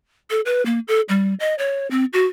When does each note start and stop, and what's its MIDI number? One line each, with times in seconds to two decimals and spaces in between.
0.30 0.41 69
0.46 0.64 71
0.66 0.79 58
0.88 1.01 69
1.09 1.34 55
1.40 1.55 75
1.58 1.89 73
1.91 2.05 60
2.13 2.26 66